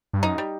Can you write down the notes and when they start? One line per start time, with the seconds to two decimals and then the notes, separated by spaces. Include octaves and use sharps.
0.13 G2
0.23 F#2 D#4
0.38 G3